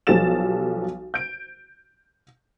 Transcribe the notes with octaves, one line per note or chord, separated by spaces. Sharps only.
B1 F3 G3 A4 A6 E7
G6 D7